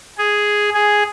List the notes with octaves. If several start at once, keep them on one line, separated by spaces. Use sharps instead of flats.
G#4
G#4